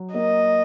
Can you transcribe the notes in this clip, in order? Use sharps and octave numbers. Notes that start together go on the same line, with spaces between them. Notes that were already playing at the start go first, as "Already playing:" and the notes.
Already playing: F#3
A#3 D#5